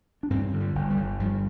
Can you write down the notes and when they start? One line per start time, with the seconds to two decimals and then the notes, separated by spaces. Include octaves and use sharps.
0.23 D4
0.30 G2 C4
0.53 D3
0.60 G3
0.75 G1
0.90 G3
0.97 G1
1.20 G2 F3